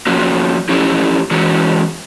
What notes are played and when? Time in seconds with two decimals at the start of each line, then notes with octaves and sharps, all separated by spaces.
0.07 F3 A#3 C#4 F#4
0.69 F3 A3 C#4 E4 G4
1.31 E3 G#3 C#4 F#4